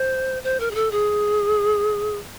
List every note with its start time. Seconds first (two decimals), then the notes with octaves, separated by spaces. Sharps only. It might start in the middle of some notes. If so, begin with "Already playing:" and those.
Already playing: C5
0.44 C5
0.60 A#4
0.71 G#4
0.75 A4
0.92 G#4